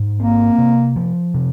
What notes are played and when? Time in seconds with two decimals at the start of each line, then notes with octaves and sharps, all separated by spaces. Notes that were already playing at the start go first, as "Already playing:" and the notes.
Already playing: G#2
0.19 A#3 C4
0.58 C3
0.96 F3
1.34 C3